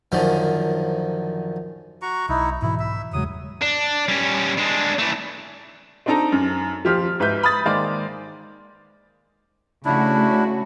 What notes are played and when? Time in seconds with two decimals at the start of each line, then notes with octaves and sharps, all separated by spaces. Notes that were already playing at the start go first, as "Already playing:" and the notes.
0.12 F#2 D3 D#3 F3
2.02 F#4 A#5 C#6
2.29 B1 D#4 E4
2.62 G#2 B2 E3 E4
2.79 E5
3.13 E1 C#3 F#3 G#3 D#6
3.62 D4
4.08 G3 C#4
4.58 G#3 D4
4.99 E3 A3
6.06 C4 D4 D#4 A4 A#5
6.32 F#2
6.84 D#1 F3 G4 C5 F6
7.20 G#2 B4 E5 G6
7.43 B5 D#6 A6
7.65 D#3 G#3 A#3 C5 D5
9.85 C#3 A3 D4 E4 F#4